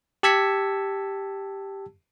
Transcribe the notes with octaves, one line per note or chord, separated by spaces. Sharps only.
G4 A5 E6 G#6 B6 C#7